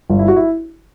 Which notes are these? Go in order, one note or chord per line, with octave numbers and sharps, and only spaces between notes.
G1
E4
F#4
E4